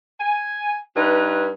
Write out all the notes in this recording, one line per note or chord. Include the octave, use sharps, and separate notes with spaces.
G#5
G2 D#4 B4